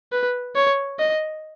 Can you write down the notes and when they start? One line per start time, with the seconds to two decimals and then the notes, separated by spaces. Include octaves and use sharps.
0.12 B4
0.56 C#5
0.99 D#5